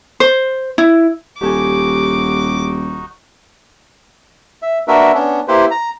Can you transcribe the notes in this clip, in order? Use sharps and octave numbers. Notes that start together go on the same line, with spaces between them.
C5
E4
D#1 D#4 F#4 G4 A4 G#5 D6
E5
A#3 D4 F#4 A#4 B4 E5
B3 C#4 D4
A#3 E4 G4 B4 C5
A#5